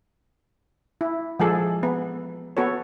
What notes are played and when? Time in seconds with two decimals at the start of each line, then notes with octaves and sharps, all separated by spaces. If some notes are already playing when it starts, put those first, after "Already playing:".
1.01 E4
1.40 F3 G#3 G#4 A4
1.83 B3
2.57 B3 F#4 A4 C#5